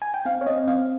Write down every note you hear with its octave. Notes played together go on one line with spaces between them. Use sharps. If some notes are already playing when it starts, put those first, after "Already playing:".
G#5
G5
C4 F5
C#5
C4 D#5
C4 F5